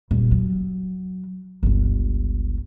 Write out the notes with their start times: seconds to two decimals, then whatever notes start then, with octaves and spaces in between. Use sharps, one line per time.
0.11 D#1 F#2
0.31 F#3
1.63 G1 C#2